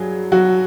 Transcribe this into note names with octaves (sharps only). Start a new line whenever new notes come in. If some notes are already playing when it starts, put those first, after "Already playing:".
Already playing: G2 F#3 G3 G#4
F#3 F#4